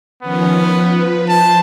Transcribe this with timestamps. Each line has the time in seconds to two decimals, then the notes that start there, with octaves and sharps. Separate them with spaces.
0.22 D#3 F3 B3 C#4
0.53 F3 B4
1.29 C5 A5